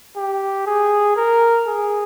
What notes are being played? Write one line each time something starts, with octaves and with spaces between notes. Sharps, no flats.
G4
G#4
A#4
G#4